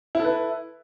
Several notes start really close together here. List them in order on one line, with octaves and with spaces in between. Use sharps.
E4 A4 B4